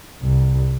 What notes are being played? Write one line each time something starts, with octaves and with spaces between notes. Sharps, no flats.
C2